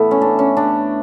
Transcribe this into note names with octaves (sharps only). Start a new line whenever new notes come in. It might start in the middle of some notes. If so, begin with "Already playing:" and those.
Already playing: A2 E3 A3 B3
C#4
D4
C#4
D4